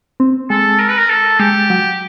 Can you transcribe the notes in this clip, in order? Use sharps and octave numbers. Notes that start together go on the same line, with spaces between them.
C4
G#3 A4
A#4
B4
A#4
A4
G#3 G4
F#3